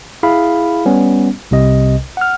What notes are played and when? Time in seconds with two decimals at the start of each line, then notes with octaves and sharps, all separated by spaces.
0.23 E4 G#4 F5 B5
0.85 G3 B3 C#4
1.51 C2 C3 D#5
2.17 F#5 F6